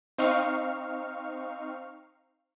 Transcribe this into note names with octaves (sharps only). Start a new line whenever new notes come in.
C4 D#4 F5 C#6 F6